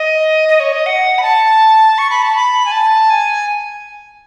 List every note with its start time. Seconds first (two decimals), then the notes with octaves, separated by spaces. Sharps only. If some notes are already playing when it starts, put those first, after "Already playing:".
Already playing: D#5
0.49 D#5
0.60 C#5
0.73 D#5
0.86 F#5
1.18 B5
1.23 A5
1.98 C#6
2.10 B5
2.23 A5
2.35 B5
2.65 G#5
2.72 A5
3.10 G#5